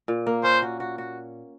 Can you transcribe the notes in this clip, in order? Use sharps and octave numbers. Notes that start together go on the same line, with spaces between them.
A#2
A#3
C#4 C5
F#4
F#4
F#4